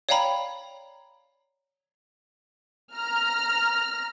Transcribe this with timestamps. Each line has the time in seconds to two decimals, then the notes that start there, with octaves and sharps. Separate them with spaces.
0.09 C#5 D5 F5 G5 A#5 B5
2.96 A#5 F6